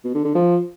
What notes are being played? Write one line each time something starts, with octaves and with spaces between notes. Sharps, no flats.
B2
D3
D3
F3